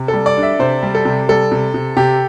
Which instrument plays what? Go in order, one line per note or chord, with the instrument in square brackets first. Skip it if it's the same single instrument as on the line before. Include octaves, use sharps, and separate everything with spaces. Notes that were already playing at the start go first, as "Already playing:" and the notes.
Already playing: [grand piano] C3
[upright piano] A4
[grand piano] G3
[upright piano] D5
[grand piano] D4
[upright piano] E5
[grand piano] C3 [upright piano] C5
[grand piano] G3
[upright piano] A4
[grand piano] C3
[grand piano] G3 [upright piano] A4
[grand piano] C3
C3
[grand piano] C3 [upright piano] G4